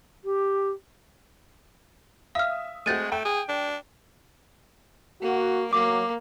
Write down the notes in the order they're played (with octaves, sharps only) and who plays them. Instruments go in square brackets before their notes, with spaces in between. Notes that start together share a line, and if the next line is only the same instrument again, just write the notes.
[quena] G4
[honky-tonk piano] E5 D#6 [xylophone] F5 F6
[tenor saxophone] G#3 [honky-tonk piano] A3 C4 F#4 [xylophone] G6 A6 D#7
[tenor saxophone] A3 [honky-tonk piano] G5
[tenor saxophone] G#4
D4
[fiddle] A#3 [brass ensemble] F#4
[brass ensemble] F#3 [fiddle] A#3 [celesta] D6